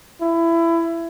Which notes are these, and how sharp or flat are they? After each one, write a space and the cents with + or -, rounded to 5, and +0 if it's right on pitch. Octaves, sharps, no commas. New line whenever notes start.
E4 +20